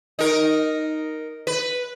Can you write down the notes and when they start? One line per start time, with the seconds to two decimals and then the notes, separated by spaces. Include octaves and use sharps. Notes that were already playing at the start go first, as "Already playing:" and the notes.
0.19 D#4 A#4
1.47 B4